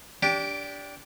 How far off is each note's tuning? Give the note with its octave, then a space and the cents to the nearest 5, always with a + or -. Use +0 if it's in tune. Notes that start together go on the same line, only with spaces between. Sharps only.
D4 -20 G4 +0